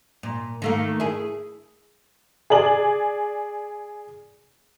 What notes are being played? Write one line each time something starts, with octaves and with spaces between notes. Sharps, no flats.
A#2
D#3 A3 A#3
E4 G#4
G#4 D5 F#7